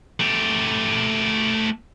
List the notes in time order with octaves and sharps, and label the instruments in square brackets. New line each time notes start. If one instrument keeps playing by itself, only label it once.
[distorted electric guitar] A3 G4